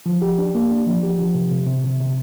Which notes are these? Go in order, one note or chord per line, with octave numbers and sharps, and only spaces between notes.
F3
G4
D4
A#3
D4
F3
G4
F3
C3
C3
C3
C3
C3